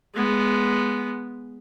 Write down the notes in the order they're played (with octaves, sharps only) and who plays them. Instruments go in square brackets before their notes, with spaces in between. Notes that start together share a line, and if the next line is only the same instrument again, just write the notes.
[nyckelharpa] G#3 B3